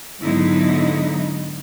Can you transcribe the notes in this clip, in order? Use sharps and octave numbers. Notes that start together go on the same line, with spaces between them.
G#2 D3 F#3 B3 D#4 E4